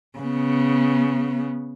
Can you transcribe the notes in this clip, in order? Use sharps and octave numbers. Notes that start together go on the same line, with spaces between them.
C#3 B3